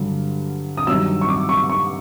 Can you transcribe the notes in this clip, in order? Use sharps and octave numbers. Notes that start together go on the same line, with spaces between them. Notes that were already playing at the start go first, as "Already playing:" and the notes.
Already playing: G2 D3 F#3
D#6
G2 D#3 F#3 E6
C#6
D6
C#6
C#6